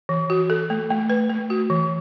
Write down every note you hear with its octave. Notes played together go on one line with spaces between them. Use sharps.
E3
F#4
A4
A3
A3
B4
A3
F#4
E3